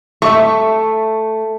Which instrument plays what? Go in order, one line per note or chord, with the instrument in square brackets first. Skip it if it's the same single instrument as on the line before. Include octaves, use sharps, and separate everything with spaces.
[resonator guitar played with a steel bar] A3 [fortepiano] E5 C#6